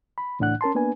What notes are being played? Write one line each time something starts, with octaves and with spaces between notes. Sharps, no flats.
B5
C#2 A2 E3 D4 F#5 F#6
C#4 A#4 A5 C6
A#3 B3 D4 B4 G#5